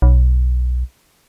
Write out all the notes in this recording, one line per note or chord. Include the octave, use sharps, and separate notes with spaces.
B1